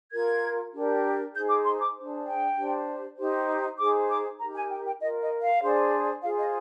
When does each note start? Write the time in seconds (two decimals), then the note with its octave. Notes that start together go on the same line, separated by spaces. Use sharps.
0.11 F4 A#4 G#6
0.73 D4 G4 A#4
1.33 D#4 G#4 C5 G6
1.49 D6
1.64 C6
1.80 D6
1.95 D4 G#4 C5
2.26 G5
2.56 D4 G4 C5
3.18 D#4 G4 C5
3.78 D#4 G#4 C5 D6
4.08 D6
4.39 D#4 G4 A#4 A#5
4.54 G#5
4.70 G5
4.86 G5
5.00 F4 A#4 D#5
5.21 D#5
5.41 F5
5.61 D4 G#4 C5
6.23 F4 G#4 C5 F5
6.38 D#5